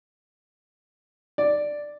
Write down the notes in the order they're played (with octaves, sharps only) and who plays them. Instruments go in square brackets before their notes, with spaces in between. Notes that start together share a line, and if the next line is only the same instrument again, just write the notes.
[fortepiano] D5